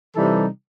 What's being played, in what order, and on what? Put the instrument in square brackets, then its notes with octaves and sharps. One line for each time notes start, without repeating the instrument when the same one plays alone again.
[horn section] C3 E3 G3 D#4 A4